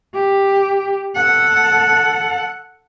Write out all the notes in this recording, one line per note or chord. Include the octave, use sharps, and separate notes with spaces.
G4
A4 F#5